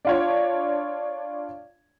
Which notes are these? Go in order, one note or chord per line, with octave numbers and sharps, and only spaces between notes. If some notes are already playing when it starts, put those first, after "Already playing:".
D4 F4 C#5